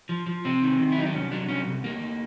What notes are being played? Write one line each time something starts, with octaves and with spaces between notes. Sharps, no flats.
F3
F3
C3 C4
D#3
D#3
E4
F#3 D#4
D4
C2 C#4
F#3 D4
C2 C#4
C2
D2 A#3
D2